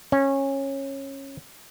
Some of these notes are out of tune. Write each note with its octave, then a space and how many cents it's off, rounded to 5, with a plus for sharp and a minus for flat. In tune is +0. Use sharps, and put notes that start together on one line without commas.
C#4 -20